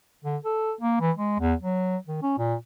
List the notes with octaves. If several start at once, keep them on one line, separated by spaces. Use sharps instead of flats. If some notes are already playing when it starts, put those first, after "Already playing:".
D3
A4
A#3
E3
G#3
E2
F#3
D#3
C#4
A#2